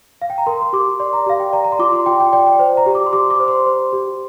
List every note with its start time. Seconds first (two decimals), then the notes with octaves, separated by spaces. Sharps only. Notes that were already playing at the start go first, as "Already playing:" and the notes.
0.22 F5
0.30 G5
0.38 A#5
0.47 A#4 C6
0.61 C6
0.73 G4 D6
1.00 D5 C6
1.13 A#5
1.27 G4 F5
1.40 G5
1.53 D5 A#5
1.65 A#5
1.72 C6
1.79 F4 D6
1.93 C6
2.06 F4 G5
2.20 G5
2.33 D5 G5
2.46 G5
2.59 C5
2.77 A#5
2.86 G4
2.95 D6
3.06 C6
3.13 G4 D6
3.30 D6
3.40 C5
3.48 C6
3.66 C5
3.93 G4